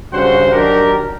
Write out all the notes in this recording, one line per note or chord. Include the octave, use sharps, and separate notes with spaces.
G2 C#3 F#4 C5 F#5 C6
D#3 F#3 D4 G4 A#4